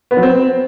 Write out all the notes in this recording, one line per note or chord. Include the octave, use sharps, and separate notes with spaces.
B3
F#3
C4